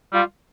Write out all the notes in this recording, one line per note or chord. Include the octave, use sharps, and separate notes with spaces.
G3 F4